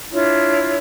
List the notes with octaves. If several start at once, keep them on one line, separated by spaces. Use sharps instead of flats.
D4 E4 F4 C#5